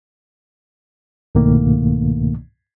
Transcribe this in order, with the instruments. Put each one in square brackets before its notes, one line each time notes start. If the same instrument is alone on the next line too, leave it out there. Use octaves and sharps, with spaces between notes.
[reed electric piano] C2 G#2 B2 D#3 A3 A#3